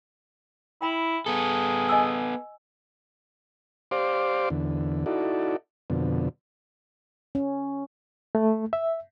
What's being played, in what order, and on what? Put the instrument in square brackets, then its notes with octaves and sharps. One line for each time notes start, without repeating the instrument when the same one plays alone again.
[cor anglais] E4 [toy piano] G5 B5
[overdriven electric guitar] B3 A4 [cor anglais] G#4
[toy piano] D#5 G#5 E6
[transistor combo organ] G4 C5 D5 F5 C6 D6
E2 D3
D#4 E4 F#4 A4 D5
F2 B2 D3
[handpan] C#4
[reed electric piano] A3
E5